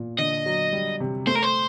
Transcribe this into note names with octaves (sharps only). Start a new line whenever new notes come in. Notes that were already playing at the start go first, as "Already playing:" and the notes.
Already playing: A#2
D3 D#5
F#3
G3
C3
A3 C5
A#4
C5